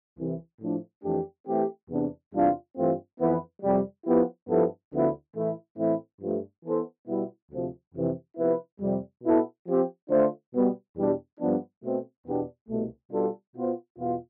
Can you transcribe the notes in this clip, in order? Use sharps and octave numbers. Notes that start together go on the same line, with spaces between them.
C2 C3 E3
A2 F3 A3 D4
F2 E3 A3 D4 G4
E3 A3 C4 G4
E2 C3 E3 B3 D4
E2 C3 G3 D4 F4
G2 E3 A3 C4 F4
F2 E3 B3 E4 B4
F2 C3 G3
F3 B3 E4 G4 B4
G2 F3 B3 E4 A4
D2 D3 F3 B3 E4
A2 E3 A3 E4
A2 E3 A3 C4 E4
G2 F3 A3
E3 B3 E4 A4 C5
B2 G3 B3 E4
D2 C3 F3
F2 C3 E3
C3 F3 B3 E4 B4
F2 C3 G3
B2 B3 E4 A4
F3 C4 G4
D3 A3 D4 F4 C5
B2 G3 B3
E2 B2 G3 D4
G2 F3 B3 D4
B2 A3 C4
E2 B2 B3 D4 G4
C2 B2 A3
B2 G3 D4 F4 A4
B2 B3 F4 C5
E2 B2 B3 F4